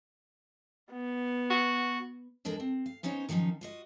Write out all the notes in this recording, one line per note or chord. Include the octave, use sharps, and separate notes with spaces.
B3
F#4
E2 G#3 D4 A4 A#4
C4
F5
B3 C#4 D#4 C5 C#5
D#3 F3 F#3 C#4 D#4
F4 F#4 D#5